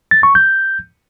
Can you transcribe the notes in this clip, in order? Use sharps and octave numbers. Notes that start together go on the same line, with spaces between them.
A6
C#6
G6